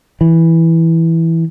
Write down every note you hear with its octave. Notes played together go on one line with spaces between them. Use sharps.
E3